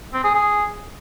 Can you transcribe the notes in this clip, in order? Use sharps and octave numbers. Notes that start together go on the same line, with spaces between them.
C4
G#4
G#4